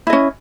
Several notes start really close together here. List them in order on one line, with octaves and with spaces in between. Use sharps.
E4 D#5 C#4